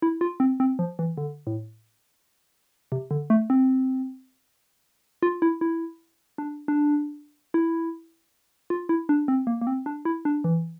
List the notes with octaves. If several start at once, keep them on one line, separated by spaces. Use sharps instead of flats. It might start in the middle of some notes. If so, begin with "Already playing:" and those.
E4
F4
C4
C4
F3
E3
D3
A2
C3
D3
A3
C4
F4
E4
E4
D4
D4
E4
F4
E4
D4
C4
A#3
A#3
C4
D4
E4
D4
E3